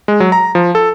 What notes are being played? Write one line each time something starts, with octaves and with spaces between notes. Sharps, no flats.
G#3
F#3
A#5
F3
A4